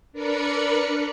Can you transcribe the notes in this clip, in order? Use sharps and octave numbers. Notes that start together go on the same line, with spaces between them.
D4 A#4 B4 D5 B5 C#7